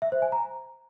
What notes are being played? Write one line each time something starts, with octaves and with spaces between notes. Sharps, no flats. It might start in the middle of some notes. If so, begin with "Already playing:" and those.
E5
C5
G#5
A#5